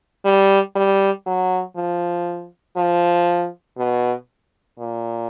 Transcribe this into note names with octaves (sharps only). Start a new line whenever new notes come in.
G3
G3
F#3
F3
F3
B2
A#2